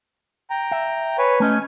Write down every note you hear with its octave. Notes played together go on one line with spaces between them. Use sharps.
G5 A#5
E5
B4 C#5 G#5
A3 C#4 D#5 G#5